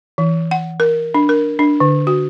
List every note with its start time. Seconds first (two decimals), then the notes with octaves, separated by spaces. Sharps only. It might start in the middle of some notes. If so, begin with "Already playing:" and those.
0.18 E3
0.51 F#5
0.80 A#4
1.14 D4
1.29 A#4
1.59 D4
1.80 D3
2.07 F#4